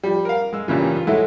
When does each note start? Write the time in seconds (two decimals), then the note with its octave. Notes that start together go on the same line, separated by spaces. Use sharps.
0.03 F3 G3
0.25 A#4 F5
0.53 G#3 E6
0.68 G2 A#2 C#3 E3
0.96 F4
1.07 F#3 G#3 A3 E4 F#4 A4